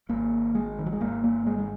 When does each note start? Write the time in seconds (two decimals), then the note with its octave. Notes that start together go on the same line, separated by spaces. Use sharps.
0.09 G#1 G#2 A#3
0.55 G#3
0.79 D#3
0.86 F#3
0.93 G#3
1.00 G#1 G#2 A#3
1.24 A#3
1.46 G#3
1.58 G#3